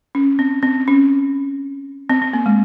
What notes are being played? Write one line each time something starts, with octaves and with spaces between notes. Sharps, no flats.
C#4
C4
C4
C#4
C4
C4
A#3
G#3